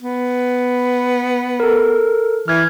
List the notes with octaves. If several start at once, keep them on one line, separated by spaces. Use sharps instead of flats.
B3
A4 A#4
E3 F6 G#6